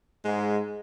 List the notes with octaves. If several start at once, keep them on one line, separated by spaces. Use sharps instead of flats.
G#2 G#3